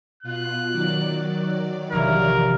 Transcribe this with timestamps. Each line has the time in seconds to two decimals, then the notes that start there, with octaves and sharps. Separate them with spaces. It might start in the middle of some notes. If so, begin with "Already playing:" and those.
0.23 B2 F4 F#6
0.72 D#3 F#3 D5
1.92 A#1 C3 E3 A#4